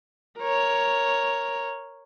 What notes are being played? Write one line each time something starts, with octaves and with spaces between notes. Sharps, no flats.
A#4 C#5